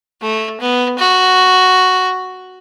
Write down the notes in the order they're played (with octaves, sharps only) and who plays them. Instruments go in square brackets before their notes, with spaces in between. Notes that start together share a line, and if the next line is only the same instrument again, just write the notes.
[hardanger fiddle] A3
B3
F#4